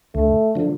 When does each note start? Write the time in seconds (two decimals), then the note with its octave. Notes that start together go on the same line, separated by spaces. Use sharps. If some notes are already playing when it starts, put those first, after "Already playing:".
0.15 D2 A3
0.55 D3 F3